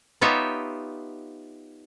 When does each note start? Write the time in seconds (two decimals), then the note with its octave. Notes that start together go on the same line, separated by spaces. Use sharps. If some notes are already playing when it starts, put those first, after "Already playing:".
0.21 B3 D#4 F4 G4 C#5 E5